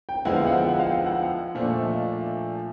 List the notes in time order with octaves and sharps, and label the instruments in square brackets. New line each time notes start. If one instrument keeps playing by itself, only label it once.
[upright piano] G5
[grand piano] D3 F3 G#3 B3 E4 [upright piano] F#5
[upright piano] F5
F#5
G5
F#5
F5
G5
F#5
[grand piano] A#2 F3 A3 D4 [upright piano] F5
[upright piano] E5
D#5
F5
E5